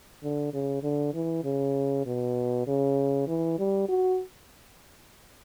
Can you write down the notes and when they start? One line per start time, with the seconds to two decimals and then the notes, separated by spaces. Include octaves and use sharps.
0.23 D3
0.54 C#3
0.83 D3
1.13 E3
1.44 C#3
2.06 B2
2.67 C#3
3.27 E3
3.58 G3
3.89 F#4